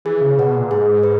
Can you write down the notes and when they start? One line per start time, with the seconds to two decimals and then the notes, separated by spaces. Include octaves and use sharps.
0.05 E3 G#4
0.21 C#3
0.38 B2 B4 F#5
0.55 A#2
0.71 G#2 G#4
1.03 B4